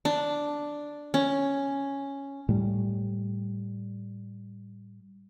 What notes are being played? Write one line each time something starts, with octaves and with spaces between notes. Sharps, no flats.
D4
C#4
A2 G3